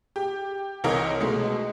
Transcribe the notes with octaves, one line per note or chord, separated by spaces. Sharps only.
G4
C2 C3 E3 A#4 C#5 D#5
B2 G#3 A3